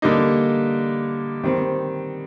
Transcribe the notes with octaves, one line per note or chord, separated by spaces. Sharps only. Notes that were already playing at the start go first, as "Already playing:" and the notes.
D3 G3 A#3 D#4
D#3 G3 C4